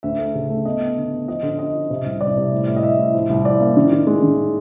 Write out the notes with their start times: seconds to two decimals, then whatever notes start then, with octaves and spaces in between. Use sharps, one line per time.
0.03 D2 E5
0.19 A3
0.35 C#3
0.50 A3
0.65 B3 D#5
0.81 B3
0.97 D3
1.12 B3
1.28 F3 D#5
1.43 D3
1.59 C#4 D#5
1.75 F3
1.90 C3
2.06 C2
2.21 C2 D5
2.37 C3
2.52 A2
2.67 A2
2.76 D#5
2.83 A2 E5
2.98 A2
3.14 F3
3.29 C2
3.45 F3 D5
3.60 A#3
3.77 D#3
3.91 D#3
4.07 G#3
4.23 D#3